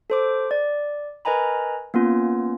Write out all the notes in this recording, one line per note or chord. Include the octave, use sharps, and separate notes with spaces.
A4 C5 D6
D5
A#4 B4 D#5 G#5 A#5 B5
A#3 B3 C#4 F4